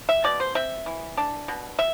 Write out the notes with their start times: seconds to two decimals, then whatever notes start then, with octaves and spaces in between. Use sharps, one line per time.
0.09 E5
0.24 B2 D5
0.40 C5
0.55 C4 E5
0.86 E3
1.17 D4
1.48 B2
1.79 E5